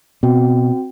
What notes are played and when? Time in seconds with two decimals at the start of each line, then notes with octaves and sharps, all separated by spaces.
0.23 B2 C4 F#4 G5